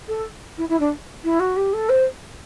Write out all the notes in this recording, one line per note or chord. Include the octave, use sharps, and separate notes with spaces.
A4
E4
E4
D4
E4
F#4
G4
A4
C5